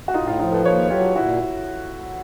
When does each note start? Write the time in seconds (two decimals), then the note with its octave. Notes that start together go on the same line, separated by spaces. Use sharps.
0.08 F#4
0.14 A2 D#4 F4
0.27 D#4 F4
0.39 F3 D#4 F4
0.52 A4 B4
0.65 D#2 B4 C#5
0.90 F#3 F4 G4
1.15 A#2 E4 F#4